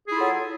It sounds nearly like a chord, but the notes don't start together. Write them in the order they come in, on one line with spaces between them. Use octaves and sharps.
G#4 E4 F4 A4 F#3